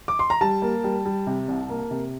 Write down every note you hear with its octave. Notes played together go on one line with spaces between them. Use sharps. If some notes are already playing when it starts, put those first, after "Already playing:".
D6
C6
A#5
G3 A5
A#3
G3
G3
C3
C2
A#3
C3